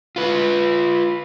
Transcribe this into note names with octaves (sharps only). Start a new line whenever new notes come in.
F4 B4